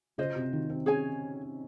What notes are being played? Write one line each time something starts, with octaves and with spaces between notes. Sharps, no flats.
C#3 F4 C5 D#5
C3
D#3
C4
C#4 G#4 C#5 G#5